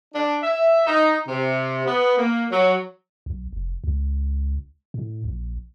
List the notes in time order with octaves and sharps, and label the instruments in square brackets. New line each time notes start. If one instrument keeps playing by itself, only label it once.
[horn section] D4
E5
D#4
C3
B3
A#3
F#3
[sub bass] B1
F1
C#2
A2
A#1